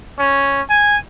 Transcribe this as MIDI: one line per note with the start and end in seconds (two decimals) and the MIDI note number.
0.19 0.61 61
0.70 0.97 80